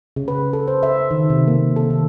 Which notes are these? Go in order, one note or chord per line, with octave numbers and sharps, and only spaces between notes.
C#3
B4
A4
C5
E5
D#3
C3
A#3
A4
D#3